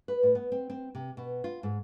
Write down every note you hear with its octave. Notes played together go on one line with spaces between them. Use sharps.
B4
A2
B3
C4
C4
C3
B2
F4
G#2